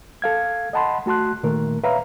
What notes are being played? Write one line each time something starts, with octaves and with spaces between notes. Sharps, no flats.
A4 F5 G#6
D#5 F#5 A5 B5 C6
A3 F#4 A5 C6 F#6
A#2 D#3 A3 A#4
B4 C#5 E5 F5 A#5